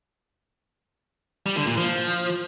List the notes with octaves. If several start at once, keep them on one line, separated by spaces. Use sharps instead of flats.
G3
D3
A#2
F3